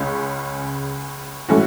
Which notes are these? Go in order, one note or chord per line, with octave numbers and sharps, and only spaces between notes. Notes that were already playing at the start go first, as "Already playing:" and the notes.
Already playing: C#2 C#3 G#3 C#4
A2 E3 A3 C#4 F#4